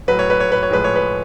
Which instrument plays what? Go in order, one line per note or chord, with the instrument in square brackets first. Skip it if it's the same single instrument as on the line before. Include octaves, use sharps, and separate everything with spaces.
[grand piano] A2 F#3 B4
C#5
B4
C#5
B4
C#5
A2 F3 G#3 B4
C#5
B4